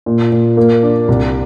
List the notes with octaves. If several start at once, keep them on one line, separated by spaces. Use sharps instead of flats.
A#2
A#2
A#3
D4
C2